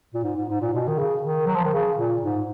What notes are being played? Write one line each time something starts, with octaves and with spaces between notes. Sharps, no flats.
A#2
G#2
G#2
G#2
A#2
B2
D#3
C#3
D#3
F#3
F3
D#3
C#3
A#2
G#2